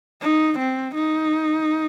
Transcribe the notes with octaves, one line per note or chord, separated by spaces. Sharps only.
D#4
C4
D#4